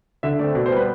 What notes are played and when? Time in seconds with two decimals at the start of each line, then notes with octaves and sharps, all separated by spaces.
0.23 D3 E5
0.39 A3 C4 D5
0.55 B2 D5
0.66 C5
0.71 G3 B3 B4